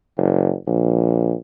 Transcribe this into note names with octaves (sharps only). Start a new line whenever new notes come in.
F#1
A#1